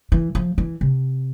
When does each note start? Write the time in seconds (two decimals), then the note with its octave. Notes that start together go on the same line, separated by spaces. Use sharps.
0.12 E3
0.35 F3
0.58 E3
0.81 C3